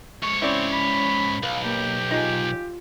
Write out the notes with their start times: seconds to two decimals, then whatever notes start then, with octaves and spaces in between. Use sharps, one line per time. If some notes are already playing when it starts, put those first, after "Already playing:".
0.23 G#2 C#5 C#6
0.42 C4 C#4 E4 D5
0.72 B5
1.43 B1 B4 F5
1.64 A#3 G4
2.11 D#4 F4 G#4